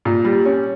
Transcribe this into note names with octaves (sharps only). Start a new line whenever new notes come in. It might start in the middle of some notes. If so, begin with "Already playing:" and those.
A#2
G3
C#4